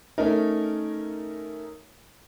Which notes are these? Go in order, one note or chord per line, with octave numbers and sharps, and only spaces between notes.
A3 C#4 D#4 A#4